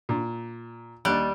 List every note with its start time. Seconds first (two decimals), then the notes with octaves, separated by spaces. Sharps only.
0.09 A#2
1.05 D#2 G3 F#6